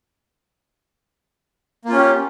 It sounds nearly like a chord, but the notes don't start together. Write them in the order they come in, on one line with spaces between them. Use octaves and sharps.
A#3 F4 C#4 G4